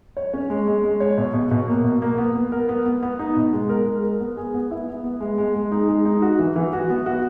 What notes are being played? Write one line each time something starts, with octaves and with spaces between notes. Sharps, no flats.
C#5
C#4
G#3
G#3
G#3
C#5
B2
B2
B2
A#3
B2
A#3
B3
B3
A#4
B3
B3
B3
D#4
B2
G#3
A#4
G#3
A#4
B3
G#4
B3
E4
B3
B3
G#3
G#3
G#3
D#4
G#3
D#4
F#4
E3
E3
F#4
B3
F#4